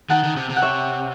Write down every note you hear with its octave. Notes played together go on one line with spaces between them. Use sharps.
D#3 F#5 A5
D#3
C3
C3
F#5
C#5 E5